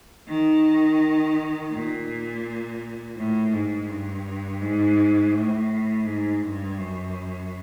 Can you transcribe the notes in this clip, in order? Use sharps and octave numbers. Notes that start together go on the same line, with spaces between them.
D#3
A#2
A2
G#2
G2
G#2
A2
G#2
G2
F#2